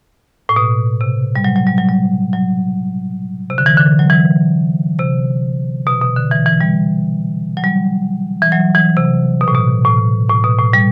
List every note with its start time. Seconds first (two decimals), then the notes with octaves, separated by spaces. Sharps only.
0.49 A2
0.56 B2
1.01 C3
1.36 G3
1.44 F#3
1.56 F#3
1.67 G3
1.78 F#3
1.89 G3
2.33 F#3
3.50 C3
3.58 D3
3.66 E3
3.77 D3
3.99 F#3
4.10 E3
4.99 C3
5.87 B2
6.02 B2
6.16 D3
6.32 E3
6.46 E3
6.61 G3
7.57 F#3
7.64 G3
8.42 E3
8.52 F#3
8.75 E3
8.97 C3
9.41 B2
9.48 A2
9.54 B2
9.85 A2
10.29 A2
10.44 B2
10.59 A2
10.73 G3